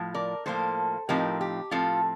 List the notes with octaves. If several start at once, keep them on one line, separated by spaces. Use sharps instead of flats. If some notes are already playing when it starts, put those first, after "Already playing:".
Already playing: A2 F3
A#4 D5
A2 F3 A#3 A4 C5
A2 F3 C4 D#4 G4 A#4
G4
A2 F3 C4 F4 A4